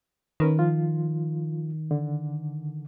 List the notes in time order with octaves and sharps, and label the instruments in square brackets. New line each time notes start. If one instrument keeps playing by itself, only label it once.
[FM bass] D#3 [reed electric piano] C#4 A#4 B4
[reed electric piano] F3 F4
D3